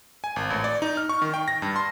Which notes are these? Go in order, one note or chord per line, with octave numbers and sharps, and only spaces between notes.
G#5
G#1
A1
D5
D#4
F6
C#6
D#3
G5
A#6
G2
C6